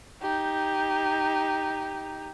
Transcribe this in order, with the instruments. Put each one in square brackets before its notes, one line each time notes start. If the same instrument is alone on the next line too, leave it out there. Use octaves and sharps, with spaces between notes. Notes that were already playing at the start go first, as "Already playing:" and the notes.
[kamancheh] D#4 G4